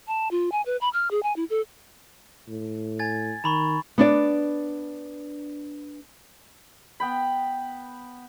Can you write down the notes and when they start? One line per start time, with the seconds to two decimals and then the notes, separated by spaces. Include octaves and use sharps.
0.07 A5
0.31 F4
0.52 G#5
0.66 B4
0.81 B5
0.93 F6
1.11 G#4
1.23 G#5
1.36 E4
1.50 A4
2.48 A2
2.99 G#5 G#6 A6
3.44 D#3 A#5 B5 C#6
3.98 B3 D4 D5
7.00 B3 G5 B5